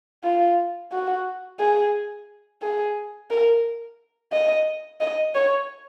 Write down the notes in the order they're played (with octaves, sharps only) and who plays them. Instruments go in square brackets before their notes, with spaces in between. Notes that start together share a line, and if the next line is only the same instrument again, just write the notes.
[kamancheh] F4
F#4
G#4
G#4
A#4
D#5
D#5
C#5